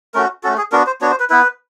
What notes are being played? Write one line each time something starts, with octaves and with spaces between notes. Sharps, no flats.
A3 C#4 F#4 A#4
A3 C#4 F#4 A4
G#4
B3 D4 F#4 A#4
C5
B3 D4 F#4 C#5
C5
B4
B3 E4 B4